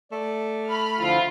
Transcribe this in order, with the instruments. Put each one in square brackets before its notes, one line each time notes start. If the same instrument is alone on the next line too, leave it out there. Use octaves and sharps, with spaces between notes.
[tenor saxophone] A3 [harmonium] D5
[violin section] B5 F6
[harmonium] D3 F3 E4 [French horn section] F4